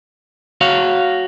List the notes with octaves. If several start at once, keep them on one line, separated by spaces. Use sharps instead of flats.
F#4 C#5 F5